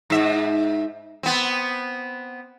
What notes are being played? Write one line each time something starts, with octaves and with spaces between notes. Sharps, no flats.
G#2 E5
B3 C4